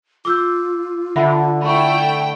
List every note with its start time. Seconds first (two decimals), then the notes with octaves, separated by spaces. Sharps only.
0.25 F4 D6 E6 G6
1.16 D3 E5 F#5 B5
1.62 A3 E4 G5 B5 C#6